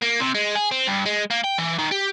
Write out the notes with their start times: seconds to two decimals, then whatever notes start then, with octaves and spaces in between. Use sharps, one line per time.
0.02 A#3
0.20 C3
0.34 G#3
0.55 G#4
0.71 C4
0.87 G2
1.05 G#3
1.31 A#3
1.44 G5
1.59 E3
1.79 D#3
1.92 G4